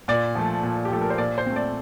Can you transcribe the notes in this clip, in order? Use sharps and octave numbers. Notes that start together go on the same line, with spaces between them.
A#2 D5
F3 A3
A#2
G4
F3 A3 A4
A#4
C5
A#2 D5
C5
A3 C4
D5